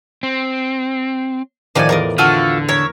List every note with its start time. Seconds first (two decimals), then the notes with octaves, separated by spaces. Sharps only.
0.23 C4
1.75 A2 D#3 F3 D5 G#5
1.89 E2 A#4 D5 D#5
2.18 D3 F4 F#4 A4
2.69 A#4 C#5 E5